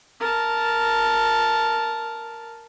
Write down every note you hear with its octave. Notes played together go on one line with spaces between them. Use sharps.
A#4 A5